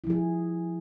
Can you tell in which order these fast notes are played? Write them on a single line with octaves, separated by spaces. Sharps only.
E4 F3 G#4